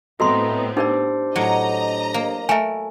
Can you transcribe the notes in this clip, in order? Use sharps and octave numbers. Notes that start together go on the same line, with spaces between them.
A2 B3 C4 F#4 A4 D#5 A#5 C6
D4 D#4 G4 A#4 C5 D5
A2 F#3 D#5 A#5
A#3
A3 A#4 E5 G#5